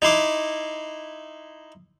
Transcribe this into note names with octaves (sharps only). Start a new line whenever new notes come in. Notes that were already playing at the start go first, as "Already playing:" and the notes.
D#4 E4 C6 D6